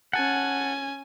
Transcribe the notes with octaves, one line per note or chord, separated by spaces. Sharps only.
C#4 F#5 G#5 A5